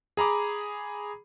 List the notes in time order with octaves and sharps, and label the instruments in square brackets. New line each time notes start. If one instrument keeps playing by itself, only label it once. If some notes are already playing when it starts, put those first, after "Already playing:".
[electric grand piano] G#4 A#5 B5 D6